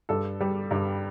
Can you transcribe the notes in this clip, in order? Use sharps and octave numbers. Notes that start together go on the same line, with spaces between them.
G2 A4
G3
G2